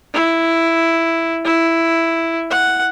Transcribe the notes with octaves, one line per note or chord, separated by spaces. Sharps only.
E4
E4
F#5